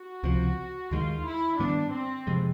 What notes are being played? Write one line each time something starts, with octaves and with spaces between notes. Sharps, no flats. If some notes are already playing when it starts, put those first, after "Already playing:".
Already playing: F#4
C#2 C3 F3
D#2 D#3 G#3 F4
E4
G#2 D#3 G3 B3 D4
C4
F2 C3 F3 G#3